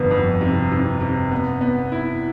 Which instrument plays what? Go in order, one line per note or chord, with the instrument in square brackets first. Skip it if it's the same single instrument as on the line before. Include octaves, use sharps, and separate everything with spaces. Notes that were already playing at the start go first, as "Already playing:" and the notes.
Already playing: [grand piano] G1 F2 [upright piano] B3
[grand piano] F2
C3
C3
C3
B3
B3
E4